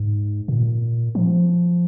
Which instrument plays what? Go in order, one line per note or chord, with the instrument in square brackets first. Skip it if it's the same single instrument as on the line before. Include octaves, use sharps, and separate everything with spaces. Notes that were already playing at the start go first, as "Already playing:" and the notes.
Already playing: [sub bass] G#2
A#2
F3